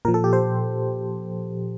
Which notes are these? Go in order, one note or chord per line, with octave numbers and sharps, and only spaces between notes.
A#2 F3 A#4
A4
G4
C5